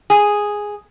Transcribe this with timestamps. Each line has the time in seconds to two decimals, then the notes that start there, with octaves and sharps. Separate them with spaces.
0.10 G#4